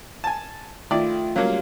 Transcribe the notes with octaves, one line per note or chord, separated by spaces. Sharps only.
G#5 A5
D#3 A3 E4 F4 D5
F#3 G3 A#3 C#4 C#5 F5